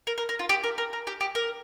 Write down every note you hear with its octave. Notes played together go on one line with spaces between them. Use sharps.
A#4
A#4
A#4
F4
G4
A#4
A#4
A#4
G4
G4
A#4